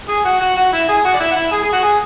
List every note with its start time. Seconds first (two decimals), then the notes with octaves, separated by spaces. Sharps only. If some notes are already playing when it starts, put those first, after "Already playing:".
0.09 G#4 G#5
0.24 F#4 F#5
0.40 F#4 F#5
0.56 F#4 F#5
0.72 E4 E5
0.88 G#4 G#5
1.05 F#4 F#5
1.14 D5
1.20 E4 E5
1.31 F#5
1.36 E4 E5
1.52 G#4 G#5
1.62 G#4 G#5
1.73 F#4 F#5
1.83 G#4 G#5